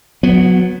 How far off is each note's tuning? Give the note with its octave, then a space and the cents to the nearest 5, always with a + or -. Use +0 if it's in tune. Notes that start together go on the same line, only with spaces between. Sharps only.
F#3 -20 B3 +5